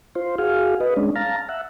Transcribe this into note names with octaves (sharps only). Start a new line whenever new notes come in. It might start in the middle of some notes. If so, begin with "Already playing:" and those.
F4 C5
F#4 G#4 F5
B4 D#5
G#3 C#4 D4
F5 A5 A#5
E5 F#5